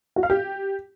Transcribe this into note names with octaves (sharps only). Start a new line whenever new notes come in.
F#4
F5
G4